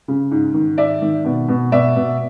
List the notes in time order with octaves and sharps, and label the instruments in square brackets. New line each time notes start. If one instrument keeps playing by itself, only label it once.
[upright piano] C#3
G#2
D#3
G#2 D5 E5
D#3
B2
B2
B2 D5 E5
B2